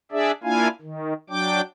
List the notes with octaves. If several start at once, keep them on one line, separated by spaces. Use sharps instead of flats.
D4 G#4 D5 E5
A#3 D4 E4 F4 F5 G#5
D#3
F#3 D4 G5 D6